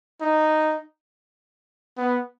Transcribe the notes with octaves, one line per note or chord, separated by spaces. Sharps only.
D#4
B3